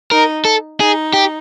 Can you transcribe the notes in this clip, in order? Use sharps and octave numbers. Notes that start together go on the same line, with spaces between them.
D#4 A#4
A4
D#4 G#4
G4